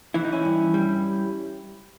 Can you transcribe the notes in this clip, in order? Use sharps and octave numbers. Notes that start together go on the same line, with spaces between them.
E3 E4
D#4
C#4 E4
G2
G3